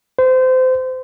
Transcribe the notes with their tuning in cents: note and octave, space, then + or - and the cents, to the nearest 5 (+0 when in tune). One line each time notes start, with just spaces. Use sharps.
C5 -25